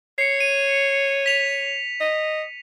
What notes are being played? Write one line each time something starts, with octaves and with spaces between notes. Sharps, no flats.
C#5 C7 C#7
D#7
B6 F7
D#5